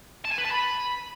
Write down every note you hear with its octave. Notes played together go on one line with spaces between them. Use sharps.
A5
G#5
B4
A5
B5